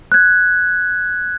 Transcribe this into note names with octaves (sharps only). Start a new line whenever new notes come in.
F#6 G#6